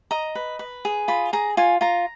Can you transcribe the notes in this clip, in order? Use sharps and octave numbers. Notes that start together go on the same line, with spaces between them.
D#5 A#5
B4
B4
G#4
F4 B5
G#4 A#5
F4 G#5
F4 A#5